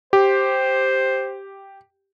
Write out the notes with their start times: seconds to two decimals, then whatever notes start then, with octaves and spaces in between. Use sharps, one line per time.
0.13 G4 C5